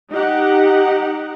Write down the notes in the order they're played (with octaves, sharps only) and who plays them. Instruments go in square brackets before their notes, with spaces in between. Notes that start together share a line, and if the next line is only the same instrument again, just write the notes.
[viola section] D#4 G4 F#5